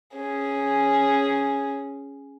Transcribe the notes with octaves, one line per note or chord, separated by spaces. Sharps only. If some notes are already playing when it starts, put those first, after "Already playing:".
C#4 G#4